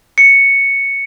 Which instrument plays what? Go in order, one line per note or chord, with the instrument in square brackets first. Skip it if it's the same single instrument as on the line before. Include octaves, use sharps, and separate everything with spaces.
[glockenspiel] C#7